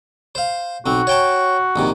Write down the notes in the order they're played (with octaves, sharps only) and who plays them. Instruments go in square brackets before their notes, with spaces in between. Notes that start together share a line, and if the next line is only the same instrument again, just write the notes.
[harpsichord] C5 F5
[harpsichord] B1 C4 [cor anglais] F#4
[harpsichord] C#5 G5 A5
A#1 C3 D#3